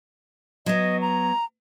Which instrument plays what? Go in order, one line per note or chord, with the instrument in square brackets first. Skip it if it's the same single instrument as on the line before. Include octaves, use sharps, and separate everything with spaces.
[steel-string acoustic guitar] F#3 B3 [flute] D#5
[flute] A#5